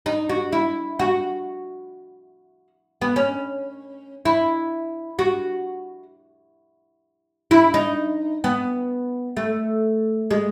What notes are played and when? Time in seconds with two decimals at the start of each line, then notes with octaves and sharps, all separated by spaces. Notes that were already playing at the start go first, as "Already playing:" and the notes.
0.06 D#4
0.29 F#4
0.52 E4
0.99 F#4
3.01 B3
3.16 C#4
4.25 E4
5.19 F#4
7.51 E4
7.74 D#4
8.44 B3
9.37 A3
10.31 G#3